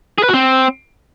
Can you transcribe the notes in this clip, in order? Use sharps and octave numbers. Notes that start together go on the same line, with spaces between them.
G#4
B4
F#4
C4